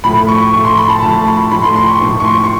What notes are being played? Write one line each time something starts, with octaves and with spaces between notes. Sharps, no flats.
A2 F3 A3 B5
C#6
A2 F3 A3 C#6
C6
B5
A5
A2 F3 A3 A5
B5
A2 F3 A3 B5
C6
C6
C#6
A2 F3 A#3 D#4
C#6
C6
C#6